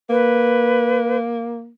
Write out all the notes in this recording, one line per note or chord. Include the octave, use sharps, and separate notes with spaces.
A#3 B4